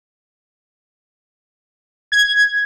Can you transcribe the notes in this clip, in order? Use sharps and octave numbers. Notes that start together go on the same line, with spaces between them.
G#6